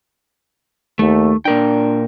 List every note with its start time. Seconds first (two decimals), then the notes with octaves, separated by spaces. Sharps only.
0.99 D#2 A3
1.45 A#2 D4 A#4 G5